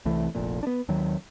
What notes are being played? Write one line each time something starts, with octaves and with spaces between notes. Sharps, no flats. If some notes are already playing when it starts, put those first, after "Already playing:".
C2 E3 A3
F1 A#1 F2 A#2
B3 D4
D#2 D#3 F#3